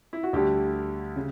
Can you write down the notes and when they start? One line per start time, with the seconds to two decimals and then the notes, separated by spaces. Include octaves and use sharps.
0.13 E4
0.23 F#4
0.33 D2 D3 G3 G4
1.16 C#3